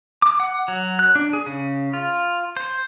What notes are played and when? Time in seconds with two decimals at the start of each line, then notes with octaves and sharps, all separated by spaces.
0.22 D6
0.40 F#5
0.68 F#3
0.99 F#6
1.15 D4
1.33 G#4
1.46 C#3
1.93 F4
2.57 C5